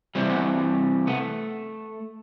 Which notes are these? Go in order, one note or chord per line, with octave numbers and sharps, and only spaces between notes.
C3 E3 G3 C4
B3
A3 B3